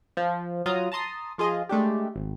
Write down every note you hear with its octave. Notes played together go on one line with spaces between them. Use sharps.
F3
F#3 F4 A#5 D#6
A5 A#5 C6 D#6
F3 F4 G#4 D#5
G#3 A3 D4 G4
G#1